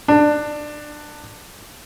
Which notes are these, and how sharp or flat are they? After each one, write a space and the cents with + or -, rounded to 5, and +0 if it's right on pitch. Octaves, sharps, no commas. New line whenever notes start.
D4 +20